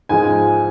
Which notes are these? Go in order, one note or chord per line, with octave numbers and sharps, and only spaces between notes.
G#2 F3 G#3 G#5